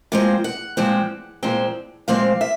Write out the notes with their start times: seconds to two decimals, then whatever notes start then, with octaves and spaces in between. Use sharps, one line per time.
0.12 A#2 F3 G#3 C4
0.44 F#5
0.77 A#2 F3 G#3 C4
1.43 A#2 F3 G#3 C4
2.08 A#2 F3 G#3 C4 F5
2.41 E5